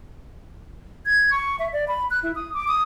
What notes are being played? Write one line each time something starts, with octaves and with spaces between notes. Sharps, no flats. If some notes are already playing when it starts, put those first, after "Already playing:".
G#6
C#6
E5
D5
B5
F#6
E4
D#6
D6
D#6